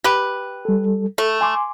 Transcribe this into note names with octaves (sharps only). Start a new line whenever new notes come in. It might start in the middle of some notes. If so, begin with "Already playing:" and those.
G4 B4
G3 A4
A3 A4
G#5 C6 D6